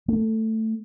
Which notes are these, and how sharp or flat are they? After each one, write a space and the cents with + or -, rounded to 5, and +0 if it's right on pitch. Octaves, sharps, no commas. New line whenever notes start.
A3 +10